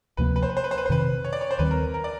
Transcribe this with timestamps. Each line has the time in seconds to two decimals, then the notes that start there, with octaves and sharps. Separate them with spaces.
0.17 D2 C3 F3 A#3 B4
0.36 B4
0.43 C5
0.49 B4
0.57 C5
0.64 B4
0.71 C5
0.78 B4
0.86 C5
0.89 F2 C3 D#3 B4
1.24 C#5
1.33 D5
1.41 C#5
1.51 C5
1.59 D#2 D#3 G3 C4 B4
1.71 A#4
1.94 A#4
2.04 D5